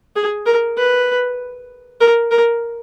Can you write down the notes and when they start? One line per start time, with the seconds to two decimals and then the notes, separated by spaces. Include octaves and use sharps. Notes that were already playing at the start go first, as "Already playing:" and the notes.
0.16 G#4
0.46 A#4
0.77 B4
2.00 A#4
2.31 A#4